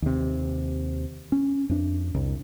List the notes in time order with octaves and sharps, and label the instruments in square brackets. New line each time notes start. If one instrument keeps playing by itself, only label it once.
[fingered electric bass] D#2 C3
C#4
F2 D4
C2